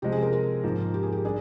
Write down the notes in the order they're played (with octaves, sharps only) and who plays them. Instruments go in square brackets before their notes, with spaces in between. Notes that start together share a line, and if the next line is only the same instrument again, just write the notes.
[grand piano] C3 F3 G#3 C4 [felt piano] G4
[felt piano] G#4
A#4
A#4
[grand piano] G#2 F3 A#3
[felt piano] G4
G#4
G4
[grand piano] G3 D4 [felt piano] G#4